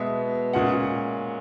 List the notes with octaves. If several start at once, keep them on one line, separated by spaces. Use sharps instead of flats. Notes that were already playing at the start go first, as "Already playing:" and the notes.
Already playing: B2 G#3 B3 E5
A#2 G#3 C#4 F#5